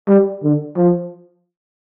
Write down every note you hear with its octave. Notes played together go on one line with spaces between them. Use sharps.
G3
D3
F3